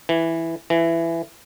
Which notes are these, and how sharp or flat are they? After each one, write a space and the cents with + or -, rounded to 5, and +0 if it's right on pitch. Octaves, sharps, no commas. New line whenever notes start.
E3 +0
E3 +15